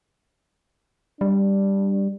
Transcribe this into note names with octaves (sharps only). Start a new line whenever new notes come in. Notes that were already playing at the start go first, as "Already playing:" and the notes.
G3 D4